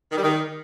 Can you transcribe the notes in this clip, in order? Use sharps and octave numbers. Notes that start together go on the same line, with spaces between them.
D#3
G3
D#3